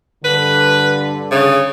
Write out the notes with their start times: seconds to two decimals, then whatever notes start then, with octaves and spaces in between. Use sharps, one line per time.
0.25 G2 D3 B4
1.31 C#3